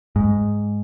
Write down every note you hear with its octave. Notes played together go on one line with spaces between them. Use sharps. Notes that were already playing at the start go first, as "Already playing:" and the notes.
G#2